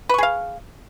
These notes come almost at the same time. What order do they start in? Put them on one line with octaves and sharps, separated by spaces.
B4 C#6 G#4 F5